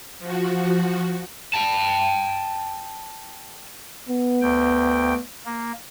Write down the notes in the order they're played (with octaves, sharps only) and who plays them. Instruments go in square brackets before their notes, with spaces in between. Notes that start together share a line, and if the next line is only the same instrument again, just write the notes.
[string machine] F3 F#4
[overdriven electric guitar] G5 A5
[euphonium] B3
[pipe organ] D2 G5
A#3